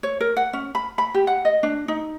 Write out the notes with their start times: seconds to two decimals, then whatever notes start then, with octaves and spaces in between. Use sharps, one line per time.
0.03 C#5
0.20 A#4
0.37 F#5
0.53 C#4
0.75 B5
0.98 B5
1.15 G4
1.27 F#5
1.45 D#5
1.63 D4
1.88 D#4